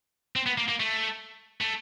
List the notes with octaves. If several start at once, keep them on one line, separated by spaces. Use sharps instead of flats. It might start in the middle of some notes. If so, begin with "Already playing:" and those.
C4
B3
A#3
A#3
A3
A3